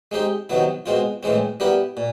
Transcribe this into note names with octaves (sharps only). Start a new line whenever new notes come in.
G#3 C4 D#4 G4
C3 D#3 F#3 B3 E4
B2 G#3 C4 F4
A2 E3 G#3 C4
G3 B3 E4 G4 A#4
A#2